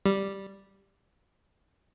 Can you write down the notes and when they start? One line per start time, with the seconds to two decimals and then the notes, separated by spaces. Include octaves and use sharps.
0.06 G3